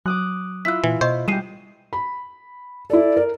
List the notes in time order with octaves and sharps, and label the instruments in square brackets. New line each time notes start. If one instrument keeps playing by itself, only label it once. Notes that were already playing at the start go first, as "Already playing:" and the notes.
[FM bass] F#3 [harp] D6 D#6 F#6
[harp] E4 F4 E5 [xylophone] F#6 B6
[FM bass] A#2 [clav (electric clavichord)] E3
[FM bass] B2 [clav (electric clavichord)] C5 [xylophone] D#5 C#6
[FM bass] G3 [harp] G#3 G4 [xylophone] C7 D#7 E7
[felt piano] B5
[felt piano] E4 A4 [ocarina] D5
[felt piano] A#4